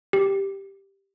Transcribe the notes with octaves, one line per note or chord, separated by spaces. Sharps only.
G4